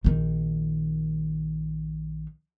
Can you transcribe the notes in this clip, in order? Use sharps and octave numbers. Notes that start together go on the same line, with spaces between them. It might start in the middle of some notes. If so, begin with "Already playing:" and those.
A#1 D#3